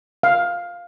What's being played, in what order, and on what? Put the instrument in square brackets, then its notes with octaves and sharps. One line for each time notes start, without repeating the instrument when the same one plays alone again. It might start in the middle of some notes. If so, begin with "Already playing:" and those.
[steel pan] F5